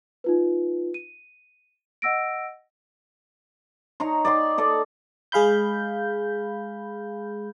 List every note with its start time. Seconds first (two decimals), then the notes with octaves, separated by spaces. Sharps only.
0.24 D#4 F4 B4
0.94 D#7
2.02 D#5 F#5 E6 A#6 D7
4.00 D#4 C#5 A#5 C6
4.25 D5 D#5 G5 C6
4.58 A4 D5 D#5
5.32 G#3 G#4 F5 B5 G6